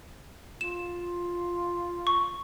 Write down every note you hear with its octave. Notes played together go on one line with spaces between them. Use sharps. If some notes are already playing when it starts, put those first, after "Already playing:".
F4 E7
C#6